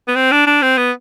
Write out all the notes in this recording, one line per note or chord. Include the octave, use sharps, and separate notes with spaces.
B3
C4
D4
D4
C4
B3